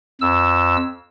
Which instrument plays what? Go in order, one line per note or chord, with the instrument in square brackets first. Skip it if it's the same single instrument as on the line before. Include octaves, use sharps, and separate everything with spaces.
[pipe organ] F2 E6